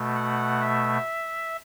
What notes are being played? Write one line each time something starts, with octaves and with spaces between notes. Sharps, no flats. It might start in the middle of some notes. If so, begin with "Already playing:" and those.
Already playing: B2 A3
F#5
E5